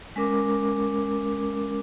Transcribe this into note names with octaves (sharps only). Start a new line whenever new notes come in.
G#3 C#4 A#4 D6